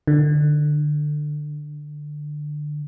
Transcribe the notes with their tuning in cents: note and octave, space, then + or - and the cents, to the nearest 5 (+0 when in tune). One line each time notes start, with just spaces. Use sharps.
D3 +20